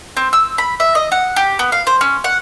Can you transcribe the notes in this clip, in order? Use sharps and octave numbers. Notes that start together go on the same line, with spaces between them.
C4
E6
B5
E5
D#5
F#5
G4
B3
F5
C5
C#4
F#5